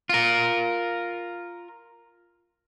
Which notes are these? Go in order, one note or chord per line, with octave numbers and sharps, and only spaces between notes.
F4 A#4